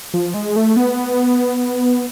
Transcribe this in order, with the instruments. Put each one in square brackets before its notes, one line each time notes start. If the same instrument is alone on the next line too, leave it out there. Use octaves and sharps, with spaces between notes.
[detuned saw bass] F3
G#3
A3
B3